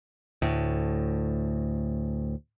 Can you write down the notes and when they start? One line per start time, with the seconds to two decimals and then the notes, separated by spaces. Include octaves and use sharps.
0.42 D2 A2